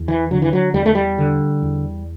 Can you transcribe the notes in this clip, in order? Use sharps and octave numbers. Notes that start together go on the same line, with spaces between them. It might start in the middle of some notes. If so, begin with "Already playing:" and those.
Already playing: E2
E3
D3 F#3
E3
F#3
E2 G3
A3
G3
D3
E2